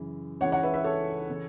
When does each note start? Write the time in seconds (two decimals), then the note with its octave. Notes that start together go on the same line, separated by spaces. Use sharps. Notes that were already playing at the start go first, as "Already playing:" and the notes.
Already playing: F#2 C#3 E3
0.41 C#2 C#3 E3 C#5 F#5
0.52 C#5 F#5
0.63 B4 E5
0.74 B4 E5
0.84 A4 C#5
1.30 C#3 E3